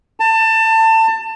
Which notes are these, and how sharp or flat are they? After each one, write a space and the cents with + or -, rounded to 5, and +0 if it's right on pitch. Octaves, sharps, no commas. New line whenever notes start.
A5 +25